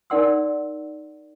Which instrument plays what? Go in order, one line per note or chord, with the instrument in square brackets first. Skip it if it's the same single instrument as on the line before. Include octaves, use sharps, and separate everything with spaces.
[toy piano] D#4 A#4 D5 F#5 C6 E6